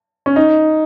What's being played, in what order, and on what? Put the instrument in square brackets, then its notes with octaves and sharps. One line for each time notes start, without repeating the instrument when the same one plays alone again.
[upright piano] C#4
D#4